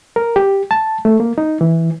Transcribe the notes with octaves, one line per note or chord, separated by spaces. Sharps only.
A#4
G4
A5
A3
A#3
D#4
E3